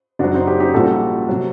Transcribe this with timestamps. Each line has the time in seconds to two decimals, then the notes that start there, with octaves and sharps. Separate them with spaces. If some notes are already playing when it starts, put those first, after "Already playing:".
0.19 F#1 F#2 F#3 D4 F#4
0.34 C4 D#4
0.47 D#4 G4
0.60 D#4 G4
0.74 A#1 A#2 G3 F#4 A4
1.29 C3 F#3